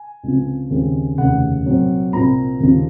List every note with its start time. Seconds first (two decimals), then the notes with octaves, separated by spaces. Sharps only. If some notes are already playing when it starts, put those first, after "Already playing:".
Already playing: G#5
0.23 C#2 C3 F3
0.70 D#2 C#3 G#3 C4
1.18 F1 D#2 C#3 F#5
1.65 C2 A#2 F#3 C4
2.13 C2 A#2 F3 C4 A#5
2.60 D#2 C#3 F3